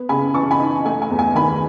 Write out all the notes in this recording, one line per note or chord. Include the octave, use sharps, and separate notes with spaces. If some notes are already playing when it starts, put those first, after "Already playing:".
Already playing: B3
C#3 G#5 B5
E3 A5 C#6
G#5 B5
D#4
A3 G#5
G#5
E2
G#5
D#3 G#5 B5